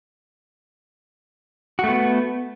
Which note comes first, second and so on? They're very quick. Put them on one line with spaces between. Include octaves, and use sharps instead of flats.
F#4 A3 B3